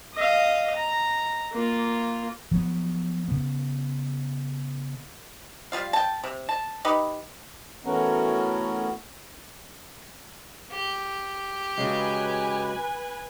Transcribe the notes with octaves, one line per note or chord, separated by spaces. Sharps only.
D#5 F5
A#5
A#3 F4
F3 F#3 B3
C#3 B3
G3 F4 F5
G5 A5
C3
A5
D#4 G4 B4
E3 A3 B3 C#4 F#4 A#4
G4
C#3 F#3 G#3 B4 G#5